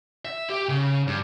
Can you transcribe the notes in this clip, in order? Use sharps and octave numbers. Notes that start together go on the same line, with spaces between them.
E5
G4
C#3
G2